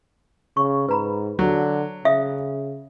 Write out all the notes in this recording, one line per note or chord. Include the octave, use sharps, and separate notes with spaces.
C#3 C#6
G#2 B4 A#5 B5
D3 F#3
C#3 E5 F5 D#6